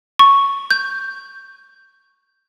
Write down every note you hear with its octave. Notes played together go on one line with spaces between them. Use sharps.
C#6
G6